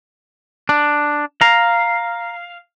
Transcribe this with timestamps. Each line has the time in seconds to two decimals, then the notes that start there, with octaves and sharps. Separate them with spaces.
0.69 D4
1.41 F5 A#5